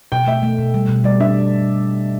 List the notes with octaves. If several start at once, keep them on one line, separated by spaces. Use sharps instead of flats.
B2 G5
A3 E5
A3
B2
G3
B2
G3 D5
D4 E5